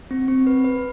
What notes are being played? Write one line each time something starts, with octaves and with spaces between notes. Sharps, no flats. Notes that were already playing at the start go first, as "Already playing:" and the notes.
C4
C4
B4
B4